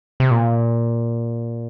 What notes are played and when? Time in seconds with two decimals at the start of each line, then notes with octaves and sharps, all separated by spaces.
0.20 C3
0.31 A#2